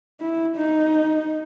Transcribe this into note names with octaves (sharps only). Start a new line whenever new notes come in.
E4
D#4